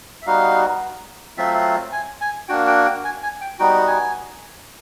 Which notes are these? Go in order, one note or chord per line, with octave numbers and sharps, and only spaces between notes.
E5
G3 B3 D#4 F#4 F5
F#3 A3 C4 F4 E5
G#5
G#5
A#3 D4 F#4 G5
G5
G5
G#5
G#5
G5
G3 B3 D#4 F#4 G5
G#5